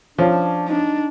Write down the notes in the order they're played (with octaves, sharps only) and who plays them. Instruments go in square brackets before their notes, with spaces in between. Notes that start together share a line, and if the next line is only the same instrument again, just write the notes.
[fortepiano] F3 C#4 [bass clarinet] D4
[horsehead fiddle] D4 [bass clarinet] D#4